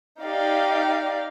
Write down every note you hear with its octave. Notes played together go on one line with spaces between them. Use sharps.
D#4 G4 D5 F5